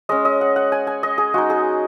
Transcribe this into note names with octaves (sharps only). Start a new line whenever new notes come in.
G#3 C#4 D#5
D#5
F#5
F#5
G#5
G#5
D#5
G#4
G#3 D#4 F#4
G#4